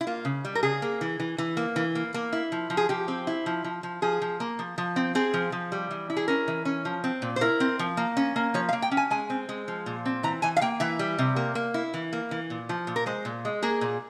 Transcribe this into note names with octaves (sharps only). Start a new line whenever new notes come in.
E4
A#3 F4
C#3
G3
A#4
C#3 G#4
A#3
E3
E3
E3
A#3
E3
A#3
A#3
E4
F3
F3
G#4
F3 G4
C4
E4
F3
F3
F3
F3 G#4
F3
A#3
F3
F3
C4
C4 G#4
F3
F3
G3
E3
E4
G#4
C#4 A#4
E3
C#4
F3
C4
A#2
C5
E4 A#4
C4
F3
A#3
C#4
A#3
F3 C#5
F5
A#3
G5
C#4
G#5
G#3 G#5
C4
G#3
F3
A#2
C4
E3 A#5
E3 G#5
F5
A#3 G5
E3 E5
G3
C3
A#3
A#3
E4
E3
A#3
E3
A#2
F3
A#2
A#4
G#3 C5
A#2
G#3
A#3 G#4
A#2